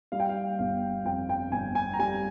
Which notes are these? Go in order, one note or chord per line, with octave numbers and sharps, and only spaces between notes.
G3 F5
G5
F5
G1 F5
F2 G5
G5
G1 G#5
G#5
A#5
G3 G#5